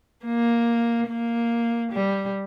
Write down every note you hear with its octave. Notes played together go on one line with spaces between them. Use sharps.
A#3
A#3
G3